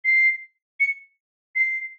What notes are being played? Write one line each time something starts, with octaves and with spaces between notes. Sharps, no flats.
C7
C#7
C7